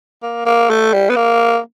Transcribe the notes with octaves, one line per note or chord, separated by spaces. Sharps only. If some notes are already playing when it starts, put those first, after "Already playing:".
A#3
A#3
A3
G3
B3
A#3